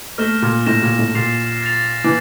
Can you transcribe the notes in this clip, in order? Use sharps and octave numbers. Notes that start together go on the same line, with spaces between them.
A3 F6 A#6 E7 G7
A#2
A2 F6 A#6 E7 G7
A#2
A2
A#2 A6 C7 F7
A6 C7 F7
E3